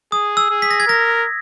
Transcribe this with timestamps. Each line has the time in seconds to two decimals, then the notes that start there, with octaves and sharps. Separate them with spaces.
0.12 G#4 D#6
0.37 E6
0.50 G#4
0.62 B6
0.71 A#6
0.80 G#6
0.87 A#4 A#6